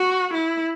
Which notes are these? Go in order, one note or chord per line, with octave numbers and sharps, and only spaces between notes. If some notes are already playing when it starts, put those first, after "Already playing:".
Already playing: F#4
E4